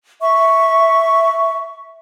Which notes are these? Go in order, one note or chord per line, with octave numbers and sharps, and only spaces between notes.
E5 C#6